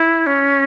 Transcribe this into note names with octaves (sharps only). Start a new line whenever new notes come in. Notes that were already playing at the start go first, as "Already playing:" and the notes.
Already playing: E4
C#4